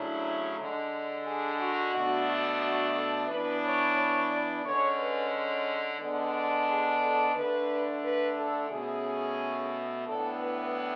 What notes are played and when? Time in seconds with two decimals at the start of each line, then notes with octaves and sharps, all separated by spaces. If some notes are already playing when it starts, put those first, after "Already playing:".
Already playing: C#3 F#3 A3 D4 E4
0.58 D3 G#3 D4
1.26 G#4
1.59 F#4
1.94 B2 A3 D4
2.61 F#4
2.95 A4
3.29 E3 B3 D4 B4
3.62 C#5
3.97 C#5
4.31 D5
4.64 D3 G#3 C#4 C#5
4.99 B4
5.99 D3 G#3 B3 D4
6.67 G#4
7.01 A4
7.35 D3 A3 D4 B4
8.03 B4
8.37 A4
8.70 B2 A3 C#4 G#4
10.06 A2 E3 B3 D4 A4
10.39 B4